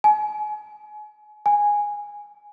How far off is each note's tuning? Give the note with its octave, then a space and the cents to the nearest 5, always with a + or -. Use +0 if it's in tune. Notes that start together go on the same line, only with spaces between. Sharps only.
G#5 +35
G#5 -10